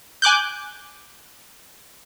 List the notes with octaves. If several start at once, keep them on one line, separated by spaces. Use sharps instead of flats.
G#5 D6 F#6 G6